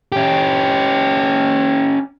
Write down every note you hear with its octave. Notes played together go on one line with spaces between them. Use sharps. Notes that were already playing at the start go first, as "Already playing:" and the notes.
C#4 G4